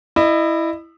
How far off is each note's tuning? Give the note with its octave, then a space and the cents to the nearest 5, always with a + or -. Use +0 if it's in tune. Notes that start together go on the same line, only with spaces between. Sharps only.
E4 +0 D#5 -30